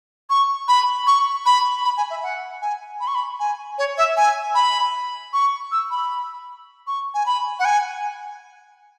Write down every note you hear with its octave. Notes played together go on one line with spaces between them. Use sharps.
C#6
B5
C#6
B5
B5
G#5
E5
F#5
G#5
B5
C#6
B5
G#5
C#5
E5
G#5
B5
C#6
E6
B5
C#6
G#5
B5
F#5
G#5